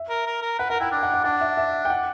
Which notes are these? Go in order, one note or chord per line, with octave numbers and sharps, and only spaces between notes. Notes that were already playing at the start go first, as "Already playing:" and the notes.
Already playing: E5
A#4
A#4
A#4
B4 F#5
A#4 F#5
E4 G5
D4
F#5
F#5
D4 F#5
E5
E5
G5
F#5